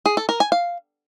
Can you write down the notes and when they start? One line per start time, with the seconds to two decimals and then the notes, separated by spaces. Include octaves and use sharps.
0.06 G#4
0.17 A4
0.29 A#4
0.40 G#5
0.52 F5